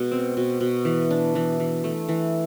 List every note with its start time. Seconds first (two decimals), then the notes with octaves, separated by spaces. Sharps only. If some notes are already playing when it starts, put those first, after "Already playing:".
Already playing: B2 G#3
0.11 C4
0.37 B2
0.61 B2
0.85 E3
1.11 D4
1.35 E3
1.60 E3
1.84 A3
2.08 E3